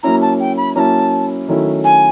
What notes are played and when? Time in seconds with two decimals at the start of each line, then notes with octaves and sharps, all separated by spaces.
0.03 F#3 A#3 C#4 E4 A#5
0.21 A5
0.40 G5
0.57 B5
0.75 F#3 A#3 C#4 E4 A5 A#5
1.48 D#3 F#3 A3 C#4 E4
1.84 G#5